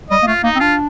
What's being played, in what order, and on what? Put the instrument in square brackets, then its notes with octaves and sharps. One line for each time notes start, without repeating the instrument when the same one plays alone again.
[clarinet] G3 [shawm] D#5
[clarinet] A#3
[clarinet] A3 [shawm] F4
[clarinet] A#3 [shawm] D#4
[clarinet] C4
[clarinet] D4 [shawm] F4